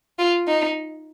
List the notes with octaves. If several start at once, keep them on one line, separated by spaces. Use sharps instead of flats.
F4
D#4